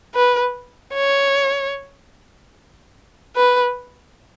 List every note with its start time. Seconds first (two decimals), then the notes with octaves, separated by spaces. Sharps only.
0.15 B4
0.95 C#5
3.36 B4